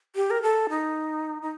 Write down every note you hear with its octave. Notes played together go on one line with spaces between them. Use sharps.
G4
A#4
A4
D#4
D#4